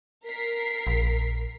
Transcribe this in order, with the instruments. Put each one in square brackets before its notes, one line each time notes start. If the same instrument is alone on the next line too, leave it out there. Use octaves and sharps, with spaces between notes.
[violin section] A#4 B6 C7
[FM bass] A#1